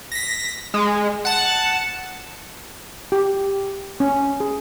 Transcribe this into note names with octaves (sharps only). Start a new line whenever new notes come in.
A#6 B6
G#3
F#5 A5
G4
C#4
G#4